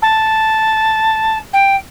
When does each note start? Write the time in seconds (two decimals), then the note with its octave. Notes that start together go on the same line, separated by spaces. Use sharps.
0.02 A5
1.53 G5